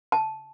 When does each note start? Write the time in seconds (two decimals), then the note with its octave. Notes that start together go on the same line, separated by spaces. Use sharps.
0.12 A5